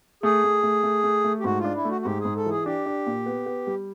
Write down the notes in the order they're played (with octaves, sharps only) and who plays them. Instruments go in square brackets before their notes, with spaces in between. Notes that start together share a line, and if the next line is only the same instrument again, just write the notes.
[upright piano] A3 [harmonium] G#4
[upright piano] A3
A3
A3
A3
A3
[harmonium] G4
[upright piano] G#2 [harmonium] F#4
[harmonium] F4
[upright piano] D4
[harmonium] E4
[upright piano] A3
[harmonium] F#4
F#4
[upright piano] G#2 [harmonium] G4
[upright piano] G#2 [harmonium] G#4
[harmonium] A4
[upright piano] E3 [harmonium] G#4
[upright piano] D4 [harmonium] G4
[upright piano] D4
A#2
B3
B3
G3